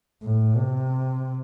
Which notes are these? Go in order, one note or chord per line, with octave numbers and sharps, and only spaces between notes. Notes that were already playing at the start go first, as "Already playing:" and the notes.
A2
C3